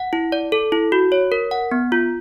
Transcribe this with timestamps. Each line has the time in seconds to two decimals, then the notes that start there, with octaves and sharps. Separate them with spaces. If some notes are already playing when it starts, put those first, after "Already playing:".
Already playing: F#5
0.13 E4
0.32 D5
0.52 A4
0.72 E4
0.92 F#4
1.12 C#5
1.32 A#4
1.51 F#5
1.71 B3
1.92 F4